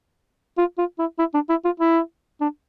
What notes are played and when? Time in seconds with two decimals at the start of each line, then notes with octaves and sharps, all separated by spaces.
0.58 F4
0.78 F4
0.99 E4
1.19 E4
1.34 D4
1.50 E4
1.65 F4
1.80 E4
2.41 D4